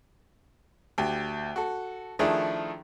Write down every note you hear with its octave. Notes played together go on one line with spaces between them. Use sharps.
D2 G4
F#4 A4
D#3 F3 A3 D4 E4 G#4